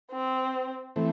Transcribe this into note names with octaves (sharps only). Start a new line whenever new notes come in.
C4
E3 A3 C4